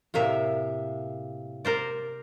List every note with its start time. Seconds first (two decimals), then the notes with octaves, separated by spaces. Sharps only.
0.14 A2 C3 A#3 E5
1.65 A#4 C5 D5